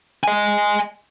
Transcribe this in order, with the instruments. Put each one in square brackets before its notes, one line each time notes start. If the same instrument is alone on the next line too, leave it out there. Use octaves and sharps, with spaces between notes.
[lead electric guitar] D#5 G#5